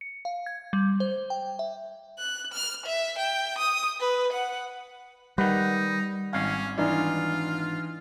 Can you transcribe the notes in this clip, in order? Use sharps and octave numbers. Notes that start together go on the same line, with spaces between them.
C#7
F5
G#6
G3
C5
G5
E5
F#6
F6
E5
G5
D#6
B4
F#5
D#3 G3 D#4 B4 F#5
G#1 C#4 F5
E3 D4 D#4 F4